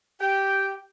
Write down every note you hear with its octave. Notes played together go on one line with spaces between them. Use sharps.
G4 G5